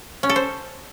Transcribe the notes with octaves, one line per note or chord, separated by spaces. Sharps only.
C#4
A4
C5